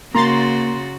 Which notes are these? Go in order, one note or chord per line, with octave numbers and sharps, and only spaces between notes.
C#3 A#3 F#4 A#5 C6 A6